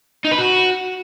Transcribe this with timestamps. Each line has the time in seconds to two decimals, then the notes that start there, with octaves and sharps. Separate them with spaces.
0.25 D#4
0.32 B4
0.38 F#4